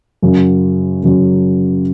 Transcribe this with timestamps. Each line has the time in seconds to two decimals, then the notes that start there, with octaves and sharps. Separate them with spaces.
0.22 F#2 C#3 F#3
1.03 F#2 C#3 F#3